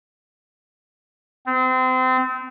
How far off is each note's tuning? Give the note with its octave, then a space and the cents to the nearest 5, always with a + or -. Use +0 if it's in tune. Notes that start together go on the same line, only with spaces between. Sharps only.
C4 -30